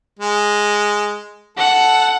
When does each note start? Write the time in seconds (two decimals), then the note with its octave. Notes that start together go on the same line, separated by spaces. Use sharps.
0.19 G#3
1.57 A4 F#5